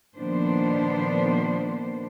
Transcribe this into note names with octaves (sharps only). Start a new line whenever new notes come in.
A#2 D#3 F3 B3 D4 C5